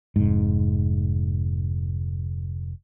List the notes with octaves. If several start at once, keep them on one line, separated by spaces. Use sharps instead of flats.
F1 G#2